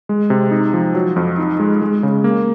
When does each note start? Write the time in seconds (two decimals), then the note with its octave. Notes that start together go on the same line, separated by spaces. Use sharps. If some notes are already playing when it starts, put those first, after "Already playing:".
0.09 G#3
0.30 C3
0.51 D#4
0.73 F3
0.95 F#3
1.16 F2
1.38 D#4
1.60 G#3
1.82 G#3
2.03 C#3
2.24 A#3